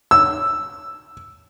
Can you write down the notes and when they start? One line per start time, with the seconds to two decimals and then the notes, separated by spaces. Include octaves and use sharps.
0.11 E6